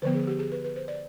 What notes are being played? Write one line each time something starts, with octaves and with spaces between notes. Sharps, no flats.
D3 F3 B3 C5
G#4
G4
G#4
B4
B4
C5
D5